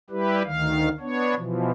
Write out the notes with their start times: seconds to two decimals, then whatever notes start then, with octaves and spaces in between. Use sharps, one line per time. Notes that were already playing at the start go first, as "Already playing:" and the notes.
0.10 G3 E4 G4 B4
0.45 D2 D#3 F5
1.00 B3 D4 C#5
1.35 B2 E3 F3